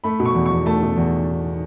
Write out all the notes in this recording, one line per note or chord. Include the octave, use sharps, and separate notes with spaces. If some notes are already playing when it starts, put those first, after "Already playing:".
A3 B5
B2
C#6
E2
C#6
E2
A3 A5
B2
E2